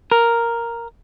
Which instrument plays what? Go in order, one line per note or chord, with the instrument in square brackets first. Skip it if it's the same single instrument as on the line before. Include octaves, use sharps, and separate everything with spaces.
[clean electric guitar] A#4